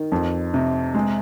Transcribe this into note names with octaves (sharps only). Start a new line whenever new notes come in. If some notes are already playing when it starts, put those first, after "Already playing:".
Already playing: D#3
F2
C3
G#3